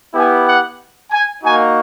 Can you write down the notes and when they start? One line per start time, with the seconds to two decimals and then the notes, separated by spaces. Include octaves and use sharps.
0.14 B3 E4 G4 G#5
0.46 F#5
1.11 G#5
1.43 A#3 D#4 F#4 G#5